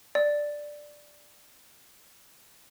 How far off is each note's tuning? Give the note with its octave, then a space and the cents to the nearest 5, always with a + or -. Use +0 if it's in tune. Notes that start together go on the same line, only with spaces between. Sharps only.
D5 +5